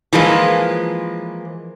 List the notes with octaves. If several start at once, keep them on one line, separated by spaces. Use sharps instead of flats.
E3 F3 G#3 A#3